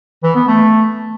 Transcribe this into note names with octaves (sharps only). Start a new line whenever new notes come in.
E3
B3
A3